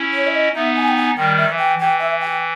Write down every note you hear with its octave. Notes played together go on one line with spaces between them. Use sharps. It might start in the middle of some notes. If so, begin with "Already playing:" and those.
Already playing: C#4 E4
C#5
E5
D#5
B3 D#4 E5
G#5
G5
G#5
D#3 G3 G5
E5
E3
G5
E3 G5
E5
G5